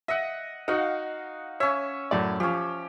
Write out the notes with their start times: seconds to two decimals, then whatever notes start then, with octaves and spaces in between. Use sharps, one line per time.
0.08 D#5 E5 F#5
0.68 D#4 F#4 D#5 F5 F#5
1.60 C#4 C#5 E5
2.11 F#2 A2 D5
2.40 F3 C#4 G4